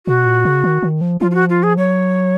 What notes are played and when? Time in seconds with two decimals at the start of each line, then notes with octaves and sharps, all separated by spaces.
0.06 B2 F#4
0.26 A#2
0.45 C#3
0.64 D#3
0.83 D#3
1.01 F3
1.20 F3 F4
1.31 F4
1.35 F#4
1.50 F4
1.63 G#4
1.77 F#3 C#5